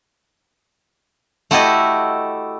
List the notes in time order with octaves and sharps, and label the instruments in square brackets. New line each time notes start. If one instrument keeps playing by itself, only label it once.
[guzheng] A3 E4 F#4 G4 A4 D#5